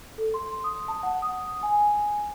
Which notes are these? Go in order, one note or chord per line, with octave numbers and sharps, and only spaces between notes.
A4
C6
D#6
A5
F#5
D#6
G#5